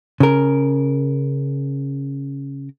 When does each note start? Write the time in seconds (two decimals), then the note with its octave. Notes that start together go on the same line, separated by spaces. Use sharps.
0.20 C#3 A#4